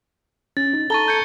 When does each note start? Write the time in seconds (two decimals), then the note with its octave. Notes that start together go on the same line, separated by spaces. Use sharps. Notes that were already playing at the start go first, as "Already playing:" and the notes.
0.57 C#4 A6
0.73 D#4
0.90 A4 A5 A#5 C#6 A6 G7
1.08 G6 G#6 C#7